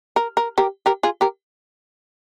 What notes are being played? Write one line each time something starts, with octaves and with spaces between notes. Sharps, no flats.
A#4
A#4
G4 A#4
G4 A#4
F4 G#4
G4 A#4